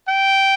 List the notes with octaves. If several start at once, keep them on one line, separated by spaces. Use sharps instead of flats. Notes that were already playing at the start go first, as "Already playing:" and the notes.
G5